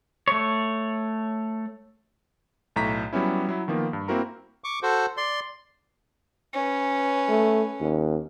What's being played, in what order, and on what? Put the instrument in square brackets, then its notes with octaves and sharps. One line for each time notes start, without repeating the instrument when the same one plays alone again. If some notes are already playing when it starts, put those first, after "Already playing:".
[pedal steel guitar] A3 C#5
[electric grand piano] B1 A2 A#5 B6
F#3 G3 B3 C#4 E4
F#3 E4
D#3 F3 A#3 B3
G2
A#3 C4 E4 F#4 A#4 A#5
[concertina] C#6 D6
F#4 A4 C5
D5 C6
[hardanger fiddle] C#4 B4
[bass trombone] A3
D#2